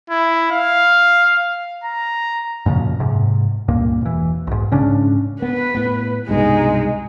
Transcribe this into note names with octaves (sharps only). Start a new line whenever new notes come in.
E4
F5
A#5
F#2 A#2 C#3 F3
G#2 C3
C#2 G2 A#2 A#3
E1 E3
B1 G#2
G#2 C#3 C#4 D4
B3 B4
A2 B3
C2 G2 B2 G#3 D#4